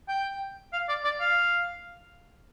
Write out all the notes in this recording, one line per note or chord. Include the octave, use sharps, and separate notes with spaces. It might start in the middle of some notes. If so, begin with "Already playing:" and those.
G5
F5
D5
D5
F5